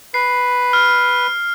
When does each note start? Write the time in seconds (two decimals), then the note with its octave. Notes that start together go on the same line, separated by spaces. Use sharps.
0.14 B4 C7
0.73 F6